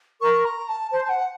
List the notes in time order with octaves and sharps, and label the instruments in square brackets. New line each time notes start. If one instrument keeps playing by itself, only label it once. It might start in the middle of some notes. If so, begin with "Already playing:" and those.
[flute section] A#4 [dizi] C#6
[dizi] A#5
A5
[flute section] C5 [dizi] A5
[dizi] A5
F#5